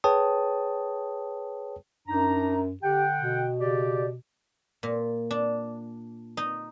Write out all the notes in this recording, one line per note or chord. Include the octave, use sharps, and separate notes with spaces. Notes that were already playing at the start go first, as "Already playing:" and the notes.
G#4 B4 C#5 G5 A5 D#6
F#2 D4 D#4 A#5
D3 G4 F#5 G5
B2
C#3 G4 D5
A#2
D4
D#4